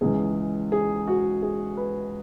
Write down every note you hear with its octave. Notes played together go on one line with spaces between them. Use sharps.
C#2 C#3 E3 G#4
G#4
F#4
G#4
B4